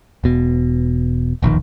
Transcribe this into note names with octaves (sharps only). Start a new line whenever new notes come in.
E1 B2
E1 A#1 D#2 D#3